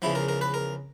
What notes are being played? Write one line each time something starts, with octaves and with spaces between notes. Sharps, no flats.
E2 C#3 F3 E4
A#4
A#4
B4
A#4